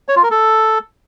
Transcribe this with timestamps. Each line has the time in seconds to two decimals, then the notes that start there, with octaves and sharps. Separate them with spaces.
0.08 C#5
0.16 F4
0.23 A#4
0.31 A4